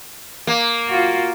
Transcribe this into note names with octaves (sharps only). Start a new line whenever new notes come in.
A#3
F4 F#4